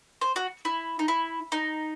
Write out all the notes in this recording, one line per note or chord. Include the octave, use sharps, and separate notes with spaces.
C5
F#4
E4
D#4
E4
D#4